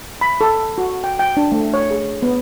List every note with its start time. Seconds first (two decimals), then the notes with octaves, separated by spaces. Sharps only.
0.21 B5
0.41 A4
0.78 F#4
1.04 G5
1.19 G5
1.37 D4
1.52 A3
1.74 C#5
1.91 G#4
2.23 B3